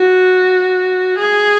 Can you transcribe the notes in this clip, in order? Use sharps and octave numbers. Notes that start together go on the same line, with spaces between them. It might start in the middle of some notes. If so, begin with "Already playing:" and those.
Already playing: F#4
G#4